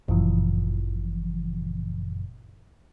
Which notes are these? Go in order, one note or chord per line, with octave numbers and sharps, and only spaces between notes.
G1 F#2 A#2 C#3 E3 F3